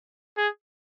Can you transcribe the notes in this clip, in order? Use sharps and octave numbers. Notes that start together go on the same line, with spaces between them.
G#4